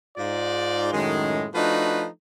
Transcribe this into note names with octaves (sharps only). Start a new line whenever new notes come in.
G#2 F4 D5
F#2 A2 D#3 G#3
F3 A3 D4 D#4 F#4 B4